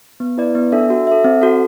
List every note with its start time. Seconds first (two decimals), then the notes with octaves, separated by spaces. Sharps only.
0.20 B3
0.38 E4 B4 D5
0.55 B3
0.72 D4 A4 E5
0.90 F#4
1.07 A4 E5
1.24 C4
1.41 F#4 A4